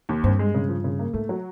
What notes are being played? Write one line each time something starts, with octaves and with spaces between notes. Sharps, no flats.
D#2
G2 C4
G#3
C#3
F3
C#3
A#3
G#2 A3
F#3